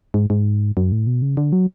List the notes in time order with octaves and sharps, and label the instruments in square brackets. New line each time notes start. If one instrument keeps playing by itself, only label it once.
[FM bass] G#2
G#2
F#2
A2
B2
C#3
D3
F#3